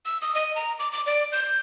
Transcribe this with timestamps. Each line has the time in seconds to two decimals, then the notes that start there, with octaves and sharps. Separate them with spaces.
0.06 E6
0.22 D#6
0.35 D#5
0.55 A#5
0.79 D6
0.92 D6
1.06 D5
1.32 G6